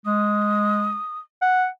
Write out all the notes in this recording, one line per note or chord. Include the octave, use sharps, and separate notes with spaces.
G#3 D#6
F#5